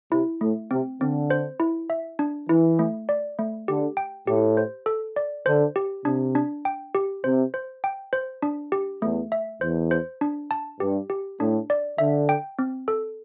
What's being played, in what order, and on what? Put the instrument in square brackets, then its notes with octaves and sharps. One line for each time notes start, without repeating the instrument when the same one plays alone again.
[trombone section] C3 [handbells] E4
[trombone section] A2 [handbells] A3
[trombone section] C3 [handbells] C4
[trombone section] D3 [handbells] C4
[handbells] C5
E4
E5
D4
[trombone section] E3 [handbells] E4
[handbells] A3
D5
A3
[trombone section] D3 [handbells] G4
[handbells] G5
[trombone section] A2 [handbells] G4
[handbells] C5
A4
D5
[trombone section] D3 [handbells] C5
[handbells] G4
[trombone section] C3 [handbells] D4
[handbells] D4
G5
G4
[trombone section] C3 [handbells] C5
[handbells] C5
G5
C5
D4
G4
[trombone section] E2 [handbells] A3
[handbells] E5
[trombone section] E2 [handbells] C5
[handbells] C5
D4
A5
[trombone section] G2 [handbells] G4
[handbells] G4
[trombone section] A2 [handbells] D4
[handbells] D5
[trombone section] D3 [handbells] E5
[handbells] G5
C4
A4